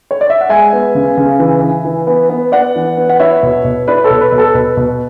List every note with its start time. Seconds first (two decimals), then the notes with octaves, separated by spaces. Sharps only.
0.11 C#5
0.21 D5
0.30 E5
0.41 F#5
0.49 G#3 E5 G#5
0.73 B3
0.95 C#3
1.17 C#3
1.39 E3
1.62 E3
1.85 E3
2.07 B3
2.30 B3
2.52 B3 D5 F#5
2.76 E3
2.97 B3
3.09 F#5
3.20 E4 C#5 E5
3.43 B2
3.65 B2
3.88 E4 B4 D5
4.04 A4 C#5
4.10 B2
4.21 B4
4.32 B2
4.38 A4
4.55 B2 B4
4.77 B2